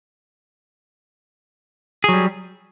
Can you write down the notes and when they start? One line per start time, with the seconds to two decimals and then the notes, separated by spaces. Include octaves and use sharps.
2.04 G#4
2.09 F#3
2.13 G3